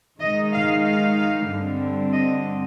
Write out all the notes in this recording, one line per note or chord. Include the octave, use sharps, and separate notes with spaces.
D#3 G#3 D#4 D#5
F5
F5
G2 D3 G3 C4
D#5